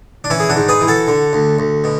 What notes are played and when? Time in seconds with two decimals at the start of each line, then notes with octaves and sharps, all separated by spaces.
0.24 D4
0.30 E3 C#4 E4
0.40 G#4
0.50 D4 F#4
0.56 G#2
0.68 G#4 B4
0.81 E3
0.88 F#4 A4
1.08 D3
1.33 D2
1.59 D2
1.84 B2